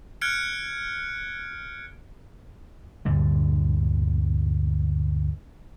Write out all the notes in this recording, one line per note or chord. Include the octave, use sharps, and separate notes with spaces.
F6 F#6 G#6 C#7 D7
D2 G2 A#2 D3